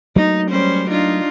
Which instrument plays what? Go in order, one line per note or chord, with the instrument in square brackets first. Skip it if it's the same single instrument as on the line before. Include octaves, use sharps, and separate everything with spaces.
[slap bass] F#3 A3 A#3 [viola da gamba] D#4
[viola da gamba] G3 C#4 C5
D4 D#4 F4